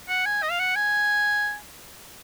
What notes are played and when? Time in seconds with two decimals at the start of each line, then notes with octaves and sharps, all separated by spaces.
0.09 F#5
0.26 G#5
0.43 D#5
0.51 F5
0.59 F#5
0.76 G#5